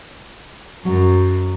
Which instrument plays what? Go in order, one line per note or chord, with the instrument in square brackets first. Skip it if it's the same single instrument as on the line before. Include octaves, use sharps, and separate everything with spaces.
[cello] F#2 [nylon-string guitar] F#3